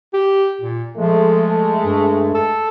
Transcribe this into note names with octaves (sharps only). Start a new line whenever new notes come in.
G4
A#2
F3 G#3 A3
G2
A4